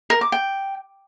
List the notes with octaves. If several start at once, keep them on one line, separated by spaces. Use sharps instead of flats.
A#4
D6
G5